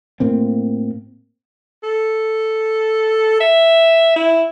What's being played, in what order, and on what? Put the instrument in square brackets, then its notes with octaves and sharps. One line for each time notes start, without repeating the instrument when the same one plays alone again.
[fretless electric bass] A2 A#3 C4
[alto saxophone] A4
E5
E4